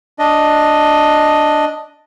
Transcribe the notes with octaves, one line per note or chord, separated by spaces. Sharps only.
D4 D#5